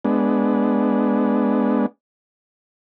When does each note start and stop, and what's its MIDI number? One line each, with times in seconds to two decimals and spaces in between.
0.05 1.86 56
0.05 1.86 59
0.05 1.86 62